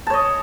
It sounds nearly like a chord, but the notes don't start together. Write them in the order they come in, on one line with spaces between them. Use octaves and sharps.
A5 C#5 D#5